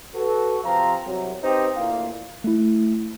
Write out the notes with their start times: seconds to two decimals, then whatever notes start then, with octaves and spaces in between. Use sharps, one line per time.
0.14 F#4 A4 B4
0.64 C3 F3 C4 F5 A#5
1.06 C2 C3 F#3
1.42 C4 D#4 G4 B4 C5
1.77 D2 A#2 A#3 E4 F5
2.44 A3 E4